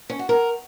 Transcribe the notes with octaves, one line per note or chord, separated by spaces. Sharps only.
C#4
F#4
A#4